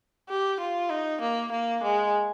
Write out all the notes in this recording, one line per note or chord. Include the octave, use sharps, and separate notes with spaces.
G4
F4
D#4
A#3
A#3
G#3